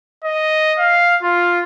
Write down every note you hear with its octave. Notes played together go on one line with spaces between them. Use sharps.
D#5
F5
F4